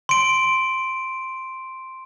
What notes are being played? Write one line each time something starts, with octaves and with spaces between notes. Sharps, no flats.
C6 D7